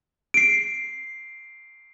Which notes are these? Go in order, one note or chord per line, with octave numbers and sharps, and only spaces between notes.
C7 D7